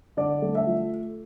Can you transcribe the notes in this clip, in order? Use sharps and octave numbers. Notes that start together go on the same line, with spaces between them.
D3 D5
A3
E5
F3